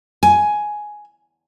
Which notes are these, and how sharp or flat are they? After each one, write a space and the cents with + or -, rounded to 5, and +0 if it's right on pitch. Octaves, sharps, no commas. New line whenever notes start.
G#5 +10